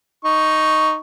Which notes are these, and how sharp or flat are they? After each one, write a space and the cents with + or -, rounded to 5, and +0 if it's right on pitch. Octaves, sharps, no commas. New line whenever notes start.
D#4 +0 C#6 +0